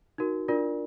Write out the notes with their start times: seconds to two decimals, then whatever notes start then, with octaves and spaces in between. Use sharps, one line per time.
0.18 D#4 F#4 A#4
0.48 D4 F4 A#4 D5